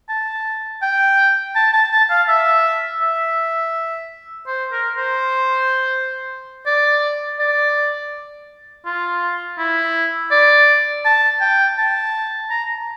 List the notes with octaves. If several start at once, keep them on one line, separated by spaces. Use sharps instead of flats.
A5
G5
A5
A5
A5
F5
E5
E5
C5
A#4
C5
D5
D5
F4
E4
D5
A5
G5
A5
A#5